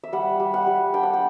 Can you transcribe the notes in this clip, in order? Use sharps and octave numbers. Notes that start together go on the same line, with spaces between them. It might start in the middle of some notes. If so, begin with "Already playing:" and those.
E5
G3 F#5
G3
F#5
G3
D4 G5
F#5
G5